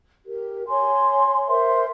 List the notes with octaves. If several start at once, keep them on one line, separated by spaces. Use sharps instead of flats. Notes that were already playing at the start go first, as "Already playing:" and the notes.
G4 A#4
C#5 G#5 C6
A#4 C5 E5 C6